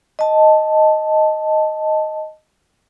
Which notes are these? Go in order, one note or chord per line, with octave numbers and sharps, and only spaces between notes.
D#5 A5